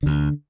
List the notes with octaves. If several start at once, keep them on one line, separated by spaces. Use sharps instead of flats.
D2 D3